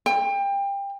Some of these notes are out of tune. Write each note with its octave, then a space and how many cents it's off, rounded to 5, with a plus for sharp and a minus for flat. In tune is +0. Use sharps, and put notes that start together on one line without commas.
G5 +25